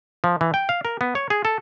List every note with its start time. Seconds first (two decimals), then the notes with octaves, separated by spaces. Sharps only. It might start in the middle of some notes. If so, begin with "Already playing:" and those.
0.24 F3
0.41 E3
0.54 G5
0.69 F5
0.85 A#4
1.01 B3
1.15 C#5
1.30 G#4
1.45 A4